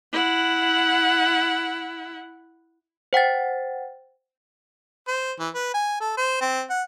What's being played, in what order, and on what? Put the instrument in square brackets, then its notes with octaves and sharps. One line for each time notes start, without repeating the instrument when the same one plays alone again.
[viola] E4 F#5
[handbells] C5 F#5 G5 A6
[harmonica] C5
E3
B4
G#5
A4
C5
C4
F#5